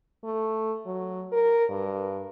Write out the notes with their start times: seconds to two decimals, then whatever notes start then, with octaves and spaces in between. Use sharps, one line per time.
0.24 A3
0.85 F#3
1.32 A#4
1.70 G2